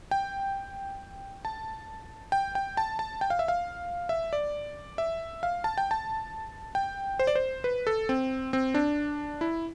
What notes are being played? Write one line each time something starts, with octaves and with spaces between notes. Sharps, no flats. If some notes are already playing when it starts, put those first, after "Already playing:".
G5
A5
G5
G5
A5
A5
G5
F5
E5
F5
E5
D5
E5
F5
A5
G5
A5
G5
C5
D5
C5
B4
A4
C4
C4
D4
E4